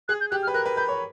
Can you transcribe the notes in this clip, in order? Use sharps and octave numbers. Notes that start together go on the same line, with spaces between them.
G#4 F#6
G6
G4 F#6
F6
B4
A#4 F#6
B4
B4 G6
C#5